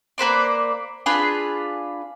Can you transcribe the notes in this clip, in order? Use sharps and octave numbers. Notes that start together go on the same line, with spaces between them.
A#3 B4 C5 D5
D4 F4 G#4 B4